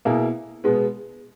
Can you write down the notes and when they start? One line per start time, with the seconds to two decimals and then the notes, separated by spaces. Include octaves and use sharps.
0.05 B2 A#3 E4 G#4
0.64 B2 G#3 B3